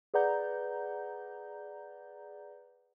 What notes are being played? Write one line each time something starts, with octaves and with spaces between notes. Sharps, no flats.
G#4 B4 D5 F#5 A#5 G6